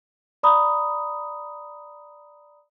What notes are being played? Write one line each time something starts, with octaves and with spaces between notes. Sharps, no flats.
D5 A#5 B5 D#6